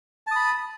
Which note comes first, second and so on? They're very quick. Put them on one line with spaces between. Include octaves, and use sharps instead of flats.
A5 D#6 B5